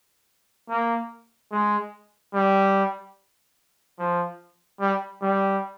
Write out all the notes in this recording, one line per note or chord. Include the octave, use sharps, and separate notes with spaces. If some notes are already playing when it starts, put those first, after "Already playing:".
A#3
G#3
G3
F3
G3
G3